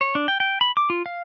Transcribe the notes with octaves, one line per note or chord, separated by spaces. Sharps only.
C#5
D4
G5
G5
B5
D6
F4
F5